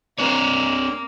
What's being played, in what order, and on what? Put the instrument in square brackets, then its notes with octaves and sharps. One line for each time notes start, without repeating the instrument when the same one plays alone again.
[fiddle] A#3 [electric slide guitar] C4 D4 C#5